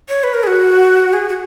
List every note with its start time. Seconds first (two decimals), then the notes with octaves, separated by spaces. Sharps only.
0.09 C#5
0.24 B4
0.34 A#4
0.43 G#4
0.47 F#4
1.13 G#4
1.29 F#4